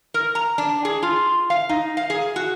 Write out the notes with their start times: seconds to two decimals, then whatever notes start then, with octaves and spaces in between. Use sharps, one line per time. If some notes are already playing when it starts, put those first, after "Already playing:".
0.14 A#4
0.35 A#5
0.58 D4
0.85 G#4
1.03 F4
1.50 F5
1.69 D#4
1.97 F5
2.10 G#4
2.36 F#4